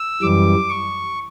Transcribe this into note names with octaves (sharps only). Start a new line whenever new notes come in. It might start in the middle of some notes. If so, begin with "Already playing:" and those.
Already playing: E6
F#2 E3 G3 D6
C#6